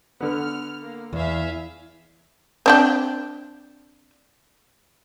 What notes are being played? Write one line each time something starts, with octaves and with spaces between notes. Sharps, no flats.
D3 B3 F6
A#3
E2 G#4 E5 F5
C4 D4 G5